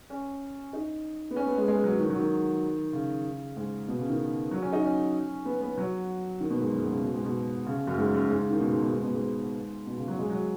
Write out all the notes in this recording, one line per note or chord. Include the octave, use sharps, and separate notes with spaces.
C#4
D#4
B3
C#4
B3
G#3
G#3
F#3
D#3
F#3
D#3
C#3
G#2
B2
C#3
D#3
F#3
C#4
D#4
C#4
B3
B3
F#3
D#3
B2
G#2
F#2
G#2
C#3
B2
G#2
B2
C#3
C#3
F#2
G#2
F#2
G#2
C#3
D#3
B2
G#2
B2
G#2
B2
G#2
B2
C#3
F#3
G#3
F#3